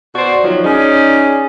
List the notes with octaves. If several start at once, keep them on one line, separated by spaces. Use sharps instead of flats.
B2 F#4 C5 D5
D#3 F3 F#3
C#4 D#4 G#4 C#5 D5